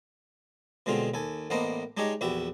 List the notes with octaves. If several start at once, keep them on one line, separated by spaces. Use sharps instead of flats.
B2 D3 G#3 C4 F4
D#2 A4 G#5
A1 A#3 B3 D4 C5 D#5
G#3 D4 D#4 G4 C#5 D#5
A#1 E2 F#4 G4 E5